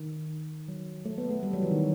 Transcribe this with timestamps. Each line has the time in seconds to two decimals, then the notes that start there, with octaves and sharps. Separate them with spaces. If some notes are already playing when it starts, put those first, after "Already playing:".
Already playing: D#3
0.68 F#3
1.05 A3
1.18 B3
1.30 A3
1.43 G3
1.53 F#3
1.63 E3
1.71 D#3